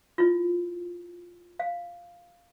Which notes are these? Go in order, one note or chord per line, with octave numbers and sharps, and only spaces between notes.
E4 F4
F5